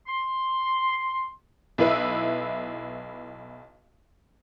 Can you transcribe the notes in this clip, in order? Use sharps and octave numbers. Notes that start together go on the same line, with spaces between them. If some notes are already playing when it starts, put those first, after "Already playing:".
C6
B1 E4 B4 E5